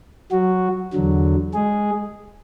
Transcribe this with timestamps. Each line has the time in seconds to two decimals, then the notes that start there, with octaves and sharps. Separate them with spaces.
0.32 F#3 F#4
0.93 E2 D3 F#3
1.54 G#3 G#4